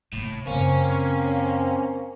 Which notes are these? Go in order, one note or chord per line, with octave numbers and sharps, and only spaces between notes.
A2 C3 A#3
F#2 C#3 A#3 C4 C#4